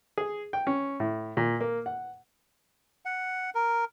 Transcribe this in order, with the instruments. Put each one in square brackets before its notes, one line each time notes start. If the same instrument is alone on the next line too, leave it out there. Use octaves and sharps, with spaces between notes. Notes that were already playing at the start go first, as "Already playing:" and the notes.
[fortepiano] G#4
G5
C#4
A2
A#2
A#3
F#5
[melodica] F#5
A#4